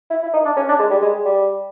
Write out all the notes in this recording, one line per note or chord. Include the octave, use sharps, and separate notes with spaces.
E4
E4
D#4
D4
C#4
D4
G#3
G3
G#3
G3